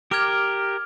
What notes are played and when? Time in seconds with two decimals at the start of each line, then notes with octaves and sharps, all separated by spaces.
0.11 G4 A#4 D6 F6 G#6